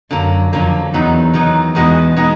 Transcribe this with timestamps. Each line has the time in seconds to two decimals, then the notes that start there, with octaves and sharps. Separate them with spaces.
0.11 F#2 D3 F#3 A#3
0.52 F2 D3 F#3 A#3
0.93 E2 D#3 F#3 B3 D#4
1.34 D#3 F#3 B3 D#4
1.75 E2 B2 G#3 B3 D#4 F#4
2.16 B2 G#3 B3 D#4 F#4